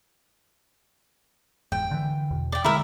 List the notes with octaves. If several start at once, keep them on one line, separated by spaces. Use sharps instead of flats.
F1 E2 G#2 G5
D3 E3
E2 B2
D5 G5
D3 G#3 E4 A#4 E5